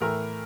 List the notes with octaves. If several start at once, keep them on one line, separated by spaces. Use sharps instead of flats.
A2 E3 A3 A#4